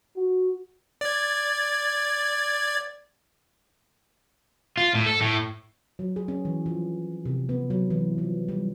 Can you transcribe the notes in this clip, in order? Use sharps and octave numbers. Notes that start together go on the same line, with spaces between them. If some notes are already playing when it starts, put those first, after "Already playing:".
F#4
D5 G#6
F4
A2
A4
A2
F#3
G#4
C#4
E3
F3
C3
B3
F#3
E3
F3
G3